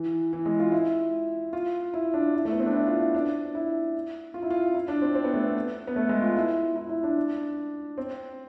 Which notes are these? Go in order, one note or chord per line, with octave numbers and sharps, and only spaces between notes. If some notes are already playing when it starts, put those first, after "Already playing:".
Already playing: E3
E3
G#3
F4
E4
F4
E4
D4
E4
A3
B3
C4
D4
E4
F4
E4
D4
E4
F4
E4
F4
E4
D4
C4
C4
B3
A3
B3
B3
A3
G#3
F4
E4
E4
E4
D4
C4